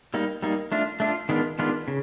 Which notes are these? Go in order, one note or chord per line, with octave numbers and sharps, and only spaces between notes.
G3 A#3 D#4
G3 A#3 D#4
A3 D4 F4
A3 D4 F4
D#3 G#3 B3 D4 F4
D#3 G#3 B3 D4 F4
C#3